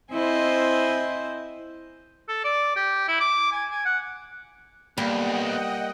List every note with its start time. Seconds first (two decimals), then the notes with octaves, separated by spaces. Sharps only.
0.12 C4 E4 C5 D#5 G#5
2.28 A4
2.44 D5
2.76 G4
3.08 E4
3.20 D6
3.52 G#5
3.70 G#5
3.85 F#5
4.98 B1 G3 A#3 D#5 F#5 G5